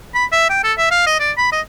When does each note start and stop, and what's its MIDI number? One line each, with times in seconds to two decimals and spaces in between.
0.15 0.26 83
0.32 0.49 76
0.50 0.64 79
0.64 0.73 69
0.78 0.87 76
0.91 1.05 77
1.06 1.18 75
1.20 1.31 74
1.38 1.49 83
1.52 1.61 75